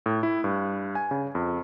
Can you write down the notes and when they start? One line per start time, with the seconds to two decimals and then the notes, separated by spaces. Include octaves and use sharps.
0.06 A2
0.23 E4
0.44 G2
0.95 G#5
1.11 C#3
1.35 F2